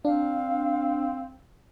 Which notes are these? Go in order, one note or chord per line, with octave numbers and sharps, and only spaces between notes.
C4 D4 F5